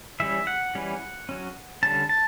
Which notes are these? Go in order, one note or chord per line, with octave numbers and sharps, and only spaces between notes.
E3 G3 C#4 E5
F#5
E3 G3 C#4
F#3 C#4
D3 G3 C#4 A5
A5